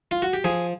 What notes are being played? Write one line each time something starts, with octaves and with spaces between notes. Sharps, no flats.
F4
F#4
G4
F3 G#4